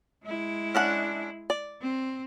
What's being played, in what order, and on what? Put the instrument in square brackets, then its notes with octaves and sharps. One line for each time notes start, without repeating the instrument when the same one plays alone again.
[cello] G#3 E4
[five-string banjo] C#4 D4 F#5
D5
[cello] C4